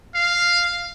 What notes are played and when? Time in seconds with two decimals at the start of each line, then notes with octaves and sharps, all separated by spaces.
0.15 F5